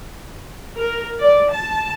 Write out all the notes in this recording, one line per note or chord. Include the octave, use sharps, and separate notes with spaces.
A#4
D5
A5